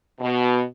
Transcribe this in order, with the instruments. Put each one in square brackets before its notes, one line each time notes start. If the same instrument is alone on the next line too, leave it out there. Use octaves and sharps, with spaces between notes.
[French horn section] B2